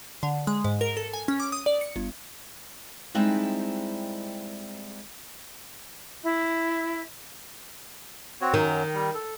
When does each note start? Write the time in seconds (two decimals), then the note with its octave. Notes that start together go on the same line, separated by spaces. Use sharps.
0.23 D3
0.47 G#3
0.64 G#2
0.81 A#4
0.97 A4
1.13 G#5
1.28 C#4
1.40 D6
1.52 D#6
1.66 D5
1.81 C#7
1.96 G1
3.14 G3 G#3 C4 D#4 E4
6.23 E4 E5
8.41 C4 F#4 C#5
8.54 F#2 D#3 F#3
8.94 G3
9.15 A4